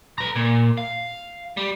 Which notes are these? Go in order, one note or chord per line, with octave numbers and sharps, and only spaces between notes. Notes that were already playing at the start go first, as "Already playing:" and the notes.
B4 A#5
A#2
F5
G3